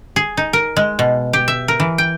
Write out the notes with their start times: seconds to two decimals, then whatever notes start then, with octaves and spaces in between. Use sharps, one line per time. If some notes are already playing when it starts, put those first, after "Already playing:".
0.16 G#4
0.37 D#4
0.53 A#4
0.77 G#3
0.99 B2
1.33 G4
1.48 E5
1.68 A#4
1.80 E3
1.98 G5